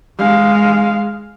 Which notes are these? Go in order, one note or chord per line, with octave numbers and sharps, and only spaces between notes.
G#3 F5